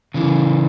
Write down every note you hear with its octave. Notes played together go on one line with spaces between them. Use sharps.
C#3 E3